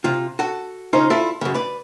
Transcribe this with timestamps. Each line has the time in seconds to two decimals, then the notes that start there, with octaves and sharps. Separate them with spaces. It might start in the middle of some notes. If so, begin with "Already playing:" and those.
0.04 C3 F4
0.39 F#4 A4
0.93 C#3 C#4 D#4 F4 C5
1.10 E4 F4 A4 D5 E5
1.41 F#2 C#3
1.54 B4 D5